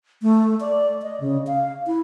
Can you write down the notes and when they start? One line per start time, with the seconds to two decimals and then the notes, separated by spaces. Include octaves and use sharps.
0.22 A3
0.60 D5
1.02 D#5
1.20 C#3
1.47 F5
1.87 E4